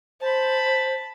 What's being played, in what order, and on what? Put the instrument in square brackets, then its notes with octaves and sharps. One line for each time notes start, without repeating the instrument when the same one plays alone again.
[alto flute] C5 [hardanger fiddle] A5 B5